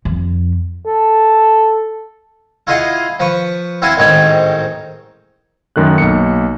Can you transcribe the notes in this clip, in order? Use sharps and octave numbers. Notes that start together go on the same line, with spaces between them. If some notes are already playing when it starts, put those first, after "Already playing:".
F2
A4
E4 F4 G#4 D#5 F5 F#5
F3 B4 C#6
C4 E4 F#4 F5 G#5 A5
A1 G#2 D#3 C4 C#5 G#5
F#2 D#3 A3 F#6
B1 A#3 C#7